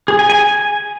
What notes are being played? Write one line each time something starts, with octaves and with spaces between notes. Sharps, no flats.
G#4
G#5
G#5
G#5